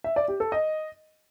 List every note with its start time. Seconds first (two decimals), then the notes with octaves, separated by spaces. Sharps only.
0.04 E5
0.16 D5
0.28 G4
0.40 A4
0.52 D#5